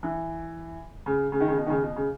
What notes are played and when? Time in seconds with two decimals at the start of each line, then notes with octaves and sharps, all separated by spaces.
0.03 E3
1.06 C#3
1.32 C#3
1.40 D#3
1.48 C#3
1.57 B2
1.66 D#3
1.70 C#3
1.83 B2
1.96 C#3